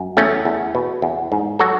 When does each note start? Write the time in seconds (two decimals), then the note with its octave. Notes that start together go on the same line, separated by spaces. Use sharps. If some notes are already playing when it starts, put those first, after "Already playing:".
Already playing: F#2
0.17 E2 A3 C#4
0.45 E2
0.75 B2
1.02 E2
1.32 G#2
1.59 F#3 F#4 A4